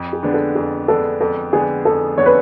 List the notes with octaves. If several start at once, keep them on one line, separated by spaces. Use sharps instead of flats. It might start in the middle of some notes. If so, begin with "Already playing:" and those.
Already playing: F2
G#4
D3 G#3 B3 D4
A4
F2 G#4
D3 G#3 B3 D4 A4
F2 A4
D3 G#3 B3 D4 G#4
F2 A4
D3 G#3 B3 D4 C#5
B4